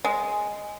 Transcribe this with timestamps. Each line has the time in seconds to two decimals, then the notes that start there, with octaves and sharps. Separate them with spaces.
0.05 G#3